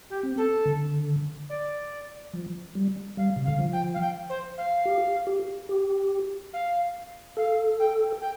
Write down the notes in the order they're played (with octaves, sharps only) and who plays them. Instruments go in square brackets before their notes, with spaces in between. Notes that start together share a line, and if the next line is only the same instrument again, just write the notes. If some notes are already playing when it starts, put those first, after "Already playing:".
[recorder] G4
[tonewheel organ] C4
[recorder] A4
[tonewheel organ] D3
[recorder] D5
[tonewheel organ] F3
G3
[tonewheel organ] G3 [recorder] F5
[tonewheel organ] C3
[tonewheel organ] D3 [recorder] F5
[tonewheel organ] F3
[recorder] G5
F5
G5
C5
F5
[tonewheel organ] G4
G4
G4
[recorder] F5
[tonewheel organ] A4 [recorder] F5
[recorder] G5
G5